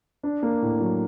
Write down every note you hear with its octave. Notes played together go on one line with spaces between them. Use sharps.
D4
A#3
A2
F#3